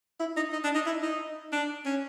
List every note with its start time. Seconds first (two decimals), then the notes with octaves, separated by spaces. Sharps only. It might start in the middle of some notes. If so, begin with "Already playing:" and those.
0.20 E4
0.37 D#4
0.53 D#4
0.64 D4
0.75 D#4
0.86 E4
1.03 D#4
1.52 D4
1.86 C#4